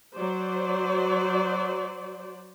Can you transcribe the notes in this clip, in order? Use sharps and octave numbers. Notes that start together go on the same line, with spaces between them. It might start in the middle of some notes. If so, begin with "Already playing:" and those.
F#3 C5 D5